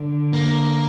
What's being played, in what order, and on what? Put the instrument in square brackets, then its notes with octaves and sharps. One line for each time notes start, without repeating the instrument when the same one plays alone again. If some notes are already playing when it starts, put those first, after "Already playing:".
Already playing: [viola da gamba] D3
[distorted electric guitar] A#3